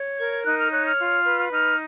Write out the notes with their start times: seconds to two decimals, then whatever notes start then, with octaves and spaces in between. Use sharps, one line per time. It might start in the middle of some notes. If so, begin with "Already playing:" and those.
Already playing: C#5
0.18 A#4 G#6
0.45 D#4 F#6
0.58 F6
0.72 C#5 F#6
0.85 F6
0.99 F4
1.25 B4
1.51 D#4 F6